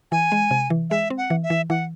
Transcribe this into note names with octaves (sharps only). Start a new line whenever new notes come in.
E3 G#5
G#3
C3
E3
G#3 E5
C4
F#5
E3
E5
E3
E3 F#5